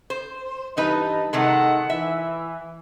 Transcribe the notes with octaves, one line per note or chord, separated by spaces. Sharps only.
C5
G2 E3 D#4 B4 D#5 A5
C3 D#3 G#3 D#4 A4 F#5
E3 E5